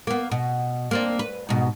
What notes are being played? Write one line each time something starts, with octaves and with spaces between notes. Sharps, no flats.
A#3 B3
B2
A#3 C4 D4
B4
G#2 B2